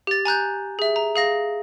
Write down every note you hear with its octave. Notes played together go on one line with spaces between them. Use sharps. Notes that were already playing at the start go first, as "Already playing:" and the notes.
G4 A6
G#5 A#5 F#6 G6
G#4 E5
A#5
G#4 F5 A#6